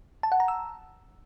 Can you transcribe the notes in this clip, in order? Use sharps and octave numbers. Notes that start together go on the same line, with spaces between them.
A5
F#5
A#5
E6